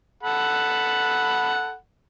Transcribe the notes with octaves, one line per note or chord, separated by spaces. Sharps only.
A4 F#5 B5